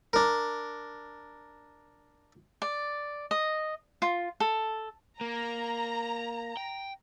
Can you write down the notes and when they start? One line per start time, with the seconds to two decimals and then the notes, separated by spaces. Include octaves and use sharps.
0.13 D4 A#4
2.62 D5
3.31 D#5
4.02 F4
4.40 A4
5.21 A#3 A#5
6.57 G5